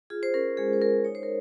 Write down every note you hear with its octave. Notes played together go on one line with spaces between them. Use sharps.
F4 G#4
C5
C#4 A#4
G#3 G#4
C5
G#3 A#4
D#4 C#5
C5
A#4